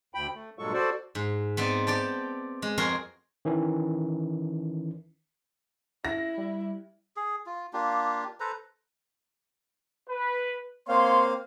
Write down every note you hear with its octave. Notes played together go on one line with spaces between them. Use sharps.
D2 G5 B5
A3
G2 A#2 F#3 G#3 A4 C#6
F#4 A4 C5 D5
G#2
B3 C4 D#4 D5
G4 D5 G5 A5
G#3
F2 F#4 G#4 A#4 C#5 C6
D#3 E3 C#4
E4 A#6
G3
G#4
F4
A#3 D4 F4 G4
A4 B4 C5 A#5
B4
A#3 C4 C#5 F5 C6